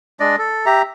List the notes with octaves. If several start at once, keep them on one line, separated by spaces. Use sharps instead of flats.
G#3 D4 D5 D#5
A4
G4 E5 A#5